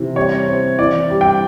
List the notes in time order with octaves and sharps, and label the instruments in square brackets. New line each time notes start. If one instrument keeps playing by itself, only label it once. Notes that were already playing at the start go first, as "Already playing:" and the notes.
Already playing: [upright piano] C3 E3
G3 C#5
C4
E3 D5
G3
G5